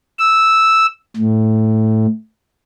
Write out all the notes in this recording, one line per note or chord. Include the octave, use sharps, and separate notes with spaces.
E6
A2